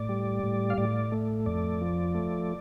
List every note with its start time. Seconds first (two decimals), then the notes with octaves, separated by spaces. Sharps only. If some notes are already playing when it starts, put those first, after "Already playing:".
Already playing: A2 D5
0.09 G3
0.43 A2
0.70 F5
0.78 A2 D5
1.12 A3
1.46 F2 D5
1.81 F3
2.15 A3